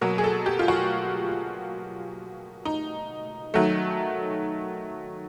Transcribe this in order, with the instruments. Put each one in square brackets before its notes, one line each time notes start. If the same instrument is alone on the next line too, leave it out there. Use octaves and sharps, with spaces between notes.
[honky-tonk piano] B2 F#3 A#3
G#4
A4
G4
F4
F#4
D#4
D#3 F#3 A3